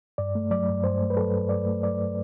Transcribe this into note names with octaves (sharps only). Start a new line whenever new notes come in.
G2 D5
A3
F#3 D5
G2
G2 C5
A3
B4
F#3 A4
G2
G2 D5
A3
F#3 D5